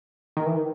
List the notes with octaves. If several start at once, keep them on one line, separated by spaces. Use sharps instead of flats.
D#3
E3
D#3